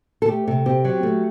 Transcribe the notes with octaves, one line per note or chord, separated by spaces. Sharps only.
A4
A3 G4
C3 A4
C4 G4
F#3
A3